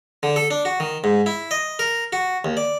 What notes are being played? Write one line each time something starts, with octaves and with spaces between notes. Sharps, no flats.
D3
A4
D4
F#4
D#3
G#2
E4
D#5
A#4
F#4
D#2
D5